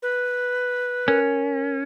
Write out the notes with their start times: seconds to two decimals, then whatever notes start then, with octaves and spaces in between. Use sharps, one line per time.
0.02 B4
1.08 C#4 A#4